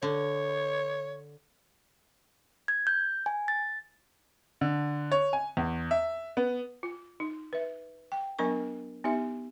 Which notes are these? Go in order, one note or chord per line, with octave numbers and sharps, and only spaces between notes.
D3 C#5
G#6
G6
G#5
A6
D3
C#5
G#5
E2
E5
B3
F4
D#4
B4 E5
G5
F#3 B3 D4 A#4 C#6
B3 D#4 G4 E5